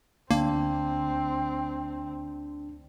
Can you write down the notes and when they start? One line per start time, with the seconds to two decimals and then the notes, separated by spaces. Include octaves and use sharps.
0.31 D2 A#3 C4 D4